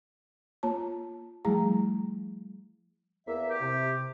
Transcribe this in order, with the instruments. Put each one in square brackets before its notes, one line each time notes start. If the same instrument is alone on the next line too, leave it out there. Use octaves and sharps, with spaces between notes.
[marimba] A#3 F4 C#5 A5
F3 G3 A3 E4 G#4 A#5
[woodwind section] E2 A#3 E5
[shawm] G4
[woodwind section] C3